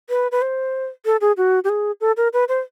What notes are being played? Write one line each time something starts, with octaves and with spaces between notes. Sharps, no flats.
B4
B4
C5
A4
G#4
F#4
G4
G#4
A4
A#4
B4
C5